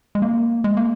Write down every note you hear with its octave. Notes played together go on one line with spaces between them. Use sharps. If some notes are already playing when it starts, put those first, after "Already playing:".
G#3
A#3
G#3
A#3